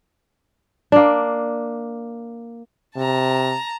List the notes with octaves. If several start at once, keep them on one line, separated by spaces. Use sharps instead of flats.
A#3 D4
C3 A5 A#5